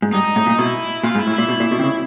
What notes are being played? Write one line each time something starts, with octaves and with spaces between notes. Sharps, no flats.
G#2
G2 D#4
A2
A#2
B2 E4
A#2 F4
G#2
E4
A2
A#2 E4
B2
A#2
B2
C3
C#3